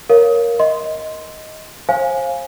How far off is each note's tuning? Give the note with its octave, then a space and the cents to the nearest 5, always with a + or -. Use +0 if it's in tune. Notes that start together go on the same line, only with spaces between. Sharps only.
A#4 +10 C#5 +0 F5 +0
D#5 +15 C6 +0
C5 +35 F5 +0 G#5 +0